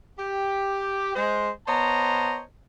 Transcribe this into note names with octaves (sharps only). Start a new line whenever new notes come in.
G4
G#3 C5
B3 C5 C#5 D#5 A5 A#5